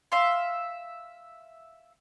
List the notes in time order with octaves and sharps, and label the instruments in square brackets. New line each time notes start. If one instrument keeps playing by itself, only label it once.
[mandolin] E5 F5 C6